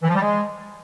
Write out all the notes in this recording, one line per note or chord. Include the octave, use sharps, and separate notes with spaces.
E3
F3
G3
G#3